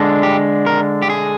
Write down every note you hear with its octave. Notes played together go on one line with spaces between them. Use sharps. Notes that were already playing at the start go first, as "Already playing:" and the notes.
Already playing: D3 G#3 D4
G4
A#4
G4
G#4